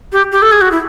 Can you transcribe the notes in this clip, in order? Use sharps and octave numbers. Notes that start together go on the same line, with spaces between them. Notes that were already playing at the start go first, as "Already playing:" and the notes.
G4
G4
A4
G#4
F#4
E4